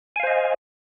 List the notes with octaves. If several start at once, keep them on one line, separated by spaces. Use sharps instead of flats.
C5 D#5 F5 G#5